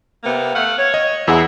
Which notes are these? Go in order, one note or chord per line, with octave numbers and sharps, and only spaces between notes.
C3 A#3 B3
A3 F5 F#5
C#5
D#5
E2 E4 G#4 F#5